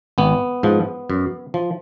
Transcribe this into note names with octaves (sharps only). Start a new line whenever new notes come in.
G#1 B3
G#2 F3
F#2
F3